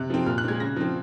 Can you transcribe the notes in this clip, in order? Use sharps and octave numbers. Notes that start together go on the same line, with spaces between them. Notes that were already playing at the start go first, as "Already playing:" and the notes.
Already playing: C3 F#6
F3 C4
A#2 F6
F#6
G#3 C4 G#6
C#3 A#6
F3 C4